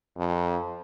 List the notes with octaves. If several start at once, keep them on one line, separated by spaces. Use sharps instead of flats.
F2